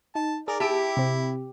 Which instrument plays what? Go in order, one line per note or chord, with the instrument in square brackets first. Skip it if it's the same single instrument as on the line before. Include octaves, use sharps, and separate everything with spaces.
[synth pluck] D#4 [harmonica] A5
[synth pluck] G#4 [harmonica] A#4 D5
[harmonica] E4 [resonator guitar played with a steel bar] G4 [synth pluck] A5 E6 D7
[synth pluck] C3 C4